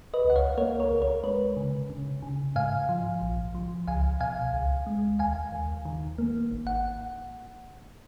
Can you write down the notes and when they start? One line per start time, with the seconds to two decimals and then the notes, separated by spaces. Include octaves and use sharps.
0.14 B4 D#5
0.25 C#2
0.30 F#5
0.36 C#5 F5
0.58 A#3 A#4 C#5
0.80 A#4 C#5
0.91 C#2
1.02 A#4 C#5
1.23 G#3 B4
1.57 C#3
1.90 C#3
2.23 C#3
2.55 G#2 F5 G#5
2.89 F3
3.22 A#1
3.55 F3
3.88 C#2 F5 G#5
4.20 B2 F5 G#5
4.54 C#2
4.87 G#3
5.19 D#2 F5 G#5
5.52 D#2
5.85 D#3
6.18 A#3
6.51 G#1
6.67 F#5